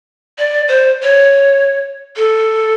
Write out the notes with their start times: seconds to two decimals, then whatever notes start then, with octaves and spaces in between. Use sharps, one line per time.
0.39 D5
0.68 C5
1.03 C#5
2.16 A4